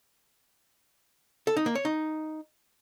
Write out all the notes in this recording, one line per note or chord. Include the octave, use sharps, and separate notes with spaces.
A4
D#4
A#3
C#5
D#4